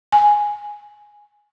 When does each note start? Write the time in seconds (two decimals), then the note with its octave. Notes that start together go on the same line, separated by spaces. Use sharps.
0.12 G#5